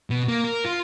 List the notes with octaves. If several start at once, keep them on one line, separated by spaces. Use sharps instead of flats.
B2
A#3
A#4
F4